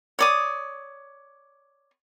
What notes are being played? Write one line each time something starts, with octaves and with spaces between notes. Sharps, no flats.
C#5 D5 D#6